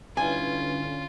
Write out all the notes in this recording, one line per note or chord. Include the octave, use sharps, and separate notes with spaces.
G2 D3 E3 C#4 F4 G#5